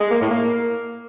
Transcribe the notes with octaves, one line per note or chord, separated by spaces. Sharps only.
G#3
A#3
A2
A#3